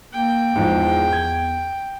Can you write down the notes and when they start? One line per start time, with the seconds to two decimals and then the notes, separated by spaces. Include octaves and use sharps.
0.13 A#3 G5
0.56 E2 G#2 E3 F3
1.13 G#6